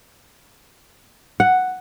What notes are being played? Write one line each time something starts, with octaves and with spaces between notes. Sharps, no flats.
F#5